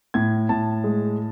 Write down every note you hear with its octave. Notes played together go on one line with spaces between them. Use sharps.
A2 G#6
A2 A5
G#3